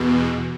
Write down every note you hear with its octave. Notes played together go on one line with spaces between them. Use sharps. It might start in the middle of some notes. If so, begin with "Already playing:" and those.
Already playing: E2 B2